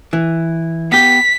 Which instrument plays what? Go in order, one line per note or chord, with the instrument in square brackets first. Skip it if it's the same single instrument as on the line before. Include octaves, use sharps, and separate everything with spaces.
[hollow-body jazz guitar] E3
[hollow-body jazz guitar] B3 G4 [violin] B6